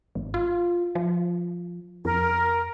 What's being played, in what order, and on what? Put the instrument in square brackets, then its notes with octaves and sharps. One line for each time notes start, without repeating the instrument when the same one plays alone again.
[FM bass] G#1
F4
F3
[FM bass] F2 [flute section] A#4